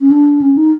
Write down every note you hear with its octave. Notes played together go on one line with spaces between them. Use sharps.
C#4
D4
C#4
D#4